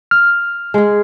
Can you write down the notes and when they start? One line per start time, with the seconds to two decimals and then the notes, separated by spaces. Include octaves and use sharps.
0.11 F6
0.74 G#3 G#4